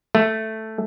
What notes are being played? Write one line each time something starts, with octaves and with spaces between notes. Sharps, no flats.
A3